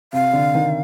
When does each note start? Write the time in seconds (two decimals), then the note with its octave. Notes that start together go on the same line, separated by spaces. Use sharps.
0.13 C3 F5
0.33 D3
0.55 D#3